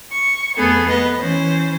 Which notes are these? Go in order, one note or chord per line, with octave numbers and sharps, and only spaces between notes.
C#6
F2 A3 B3 G#4 A4
B3 B4 D#5
E3 C#4 C5